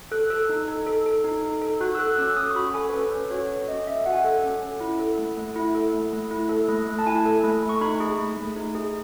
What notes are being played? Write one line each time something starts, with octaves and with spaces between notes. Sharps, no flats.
A4 F#6
A4 E6
D#4
D#4
A4
A4
D#4
D#4
A4
F#4 F#6
E6
A4 F#6
C#4 E6
E6
C#4 D#6
C#6
F#4 B5
A4 G#5
B4
C#4 A4
C#4 B4
F#4 C#5
A4
C#4 D#5
C#4 E5
F#4 F#5
G#5
A4 F#5
C#4
C#4
E4
A4
A3
A3
E4
A4
A3
A3
E4
A4
A3
A3
A5
E4 G#5
A4
A3
A3
C#6
D#4 B5
G#4
A3
A3
D#4
G#4